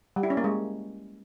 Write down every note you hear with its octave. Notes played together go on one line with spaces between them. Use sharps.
G3
E4
C#4
A#3
G#3